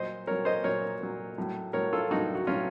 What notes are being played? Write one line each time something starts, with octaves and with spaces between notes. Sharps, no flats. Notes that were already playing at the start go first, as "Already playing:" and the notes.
Already playing: A#2 F#3 C5 D#5
A#2 F#3 A#4 C#5
C5 D#5
A#2 F#3 A#4 C#5
A#2 F#3
A2 F#3
A2 F#3 A#4 C#5
F4 A4
A2 F#3 D#4 F#4
F#4
A2 F#3 C#4 F4